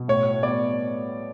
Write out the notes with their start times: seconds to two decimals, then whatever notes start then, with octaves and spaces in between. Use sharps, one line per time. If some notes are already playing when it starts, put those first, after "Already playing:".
Already playing: B2
0.08 A2 C#5
0.43 B3 D5